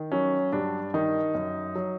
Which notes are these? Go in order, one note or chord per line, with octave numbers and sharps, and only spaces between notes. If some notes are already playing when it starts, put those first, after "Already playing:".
Already playing: D#3
F#3 C#4
G2 D4
D#3 D#4
F#2
F#3